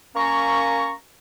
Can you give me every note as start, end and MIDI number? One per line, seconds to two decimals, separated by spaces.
0.16 0.91 58
0.16 0.91 61
0.16 0.91 82
0.16 0.91 85